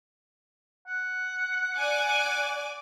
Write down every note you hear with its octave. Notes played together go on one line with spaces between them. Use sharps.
F#5
D5 G#5 D6